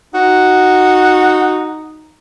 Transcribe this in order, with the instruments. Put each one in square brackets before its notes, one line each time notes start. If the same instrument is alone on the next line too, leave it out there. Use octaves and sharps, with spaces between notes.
[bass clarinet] D#4 [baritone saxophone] F#4